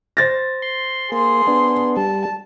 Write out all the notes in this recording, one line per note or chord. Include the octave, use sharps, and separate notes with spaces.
C5 A6 A#6
C6
A#3 G#4 C6
B3 D4
G3 A5